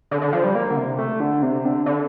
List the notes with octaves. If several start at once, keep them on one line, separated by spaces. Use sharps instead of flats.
D3
D3
F3
G3
A#3
D3
C3
A3
D3
C3
D3
D3